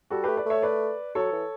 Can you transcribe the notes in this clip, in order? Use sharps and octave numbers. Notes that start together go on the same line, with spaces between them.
G3 F#4 A4
A3 G4 B4
B4 D5
A3 C#5 E5
B4 D5
F#3 A4 C#5
E3